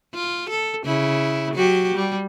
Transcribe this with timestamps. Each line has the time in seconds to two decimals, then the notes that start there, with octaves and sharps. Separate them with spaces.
0.14 F4
0.50 A4
0.86 C#3 E4
1.54 F#3 F#4 G4
1.95 G3